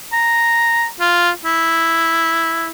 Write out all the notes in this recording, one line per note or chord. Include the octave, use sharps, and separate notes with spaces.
A#5
F4
E4